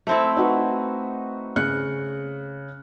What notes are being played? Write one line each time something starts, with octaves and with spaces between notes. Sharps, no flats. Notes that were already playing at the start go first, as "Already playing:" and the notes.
A3 C4 E4
D#4 F#4 B4
C#3 F#6 C#7